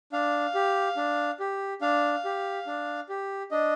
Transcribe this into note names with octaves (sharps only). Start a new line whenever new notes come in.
D4 F5
G4
D4
G4
D4 F5
G4
D4
G4
D4 D#5